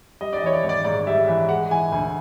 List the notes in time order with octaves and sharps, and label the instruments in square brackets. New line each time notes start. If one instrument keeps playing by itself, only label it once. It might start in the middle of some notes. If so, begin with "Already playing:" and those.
[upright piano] G3 D#5
D5
D#5
E3 C#5
D5
G#1
D5
G#2 D5
G3 E5
E3 E5
G#3 F#5
E3 G#5
D2 G#5